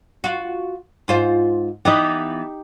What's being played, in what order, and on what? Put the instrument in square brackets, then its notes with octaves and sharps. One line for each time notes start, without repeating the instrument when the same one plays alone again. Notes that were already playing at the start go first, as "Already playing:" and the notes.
[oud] F4 F#4
G#2 F4 C5
[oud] E3 B3 [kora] D#4 G4